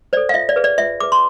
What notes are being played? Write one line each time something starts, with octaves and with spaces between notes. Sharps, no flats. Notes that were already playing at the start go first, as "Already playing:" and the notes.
A4 C5 D5
F5
F4 E5
D5
G#4 B4
D5
F4 E5
G#4 B4 D6
C6